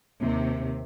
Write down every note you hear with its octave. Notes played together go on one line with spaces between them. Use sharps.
D#2 C3